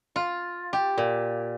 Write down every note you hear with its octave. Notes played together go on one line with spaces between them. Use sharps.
F4
G4
A#2